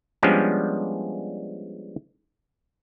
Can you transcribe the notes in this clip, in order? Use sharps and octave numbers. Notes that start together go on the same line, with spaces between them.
F3 G3 G#3 B3 C#4 D4